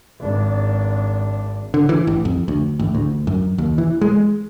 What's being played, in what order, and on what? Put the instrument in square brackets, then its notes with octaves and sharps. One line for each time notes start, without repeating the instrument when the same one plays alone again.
[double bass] G#1 D4
[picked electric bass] D3
E3
A1
F2
D2
A1
D2
F#2
D#2
E3
G#3